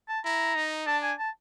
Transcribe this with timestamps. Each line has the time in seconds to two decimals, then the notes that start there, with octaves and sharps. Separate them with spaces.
0.09 A5
0.25 E4 A#5
0.56 D#4
0.87 D4 A5
1.03 G#5
1.19 A5